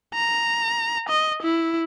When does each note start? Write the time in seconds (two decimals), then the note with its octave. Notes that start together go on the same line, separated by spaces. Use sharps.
0.14 A#5
1.09 D#5
1.43 E4